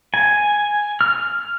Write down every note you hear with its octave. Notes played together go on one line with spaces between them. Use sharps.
G#5
F6